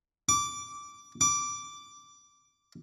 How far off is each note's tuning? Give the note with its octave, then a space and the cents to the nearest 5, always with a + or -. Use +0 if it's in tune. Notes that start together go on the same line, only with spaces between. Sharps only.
D6 -10
D6 -5